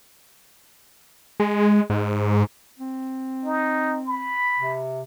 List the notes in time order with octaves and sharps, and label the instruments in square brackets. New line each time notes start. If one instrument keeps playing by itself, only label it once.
[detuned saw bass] G#3
G#2
[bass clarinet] C4
[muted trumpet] D#4
B5
[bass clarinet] C3